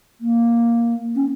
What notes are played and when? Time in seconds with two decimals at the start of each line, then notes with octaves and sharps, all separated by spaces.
0.21 A#3
1.16 C#4